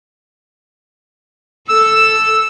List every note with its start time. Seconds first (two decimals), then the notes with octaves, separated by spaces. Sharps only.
1.69 A4 E6